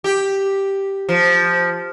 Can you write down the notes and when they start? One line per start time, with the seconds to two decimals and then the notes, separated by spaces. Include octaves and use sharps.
0.04 G4
1.09 F3